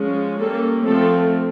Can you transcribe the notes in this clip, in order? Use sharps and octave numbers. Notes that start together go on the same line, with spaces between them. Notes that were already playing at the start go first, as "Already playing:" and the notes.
Already playing: F3 G#3 C#4
G3 A#3 C#4 A4
F3 A3 C4 A4